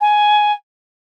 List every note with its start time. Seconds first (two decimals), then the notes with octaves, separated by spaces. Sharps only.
0.01 G#5